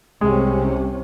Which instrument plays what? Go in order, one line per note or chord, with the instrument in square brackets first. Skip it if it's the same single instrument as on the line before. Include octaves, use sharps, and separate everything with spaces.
[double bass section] C2 C3 C#4 [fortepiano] G#3